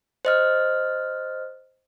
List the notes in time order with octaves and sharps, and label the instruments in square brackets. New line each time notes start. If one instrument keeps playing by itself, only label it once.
[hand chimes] C5 D#5 F6